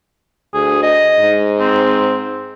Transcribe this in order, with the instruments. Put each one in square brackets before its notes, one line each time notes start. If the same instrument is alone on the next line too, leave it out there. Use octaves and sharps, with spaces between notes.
[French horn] D2 [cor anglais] G#4
[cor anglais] D#5
[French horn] G#2
[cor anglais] C4